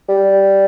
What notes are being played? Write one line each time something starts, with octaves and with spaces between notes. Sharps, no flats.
G3